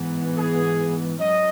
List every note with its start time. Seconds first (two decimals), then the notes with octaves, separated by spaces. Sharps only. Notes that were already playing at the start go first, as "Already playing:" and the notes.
Already playing: G#2 E3 B3
0.35 G#4
1.20 G#2 F#3 C#4 D#5